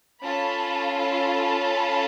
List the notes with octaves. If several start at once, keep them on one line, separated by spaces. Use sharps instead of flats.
C#4 F4 A4 A5 B5
A5 B5